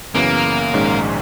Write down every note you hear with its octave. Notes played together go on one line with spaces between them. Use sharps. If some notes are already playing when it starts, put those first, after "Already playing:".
F#2 C#3 E3 A#3 B3
A#1 G#2 D#3 G#3 C#4